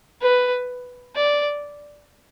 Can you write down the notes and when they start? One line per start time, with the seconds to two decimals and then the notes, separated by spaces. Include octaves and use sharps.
0.22 B4
1.16 D5